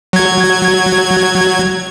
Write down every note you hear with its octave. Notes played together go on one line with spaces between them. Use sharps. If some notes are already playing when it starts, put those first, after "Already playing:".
F#3 G#6